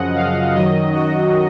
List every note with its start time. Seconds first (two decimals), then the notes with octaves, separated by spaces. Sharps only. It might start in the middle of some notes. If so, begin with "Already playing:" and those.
Already playing: F#2 C#3 F3 D#5 F#5
0.15 F5
0.54 F#2 D#3 F#3 D#5
0.94 F#4